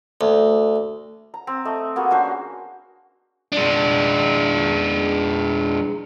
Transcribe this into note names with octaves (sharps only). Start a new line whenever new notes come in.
D2
A#5
C4
A3 D#5
A#3 B3 F#4 G#4
C#4 D4 F#4 C5
G#3 D4